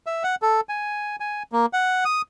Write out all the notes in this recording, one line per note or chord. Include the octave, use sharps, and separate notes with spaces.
E5
F#5
A4
G#5
G#5
A#3
F#5
D#6